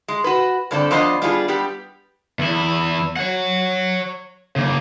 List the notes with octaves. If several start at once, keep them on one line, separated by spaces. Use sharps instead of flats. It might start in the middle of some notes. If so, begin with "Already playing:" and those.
G#3
F#4 B4
G2 D3 C4 A4 D5
F3 B3 D4 C5 D#5
G3 B3 D4 F4 F#4 G#4
G3 B3 G4
E2 E4
C#5 F#5
C#3 A#3